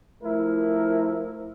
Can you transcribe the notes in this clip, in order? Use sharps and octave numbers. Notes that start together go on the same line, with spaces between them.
F3 A3 E4 A#4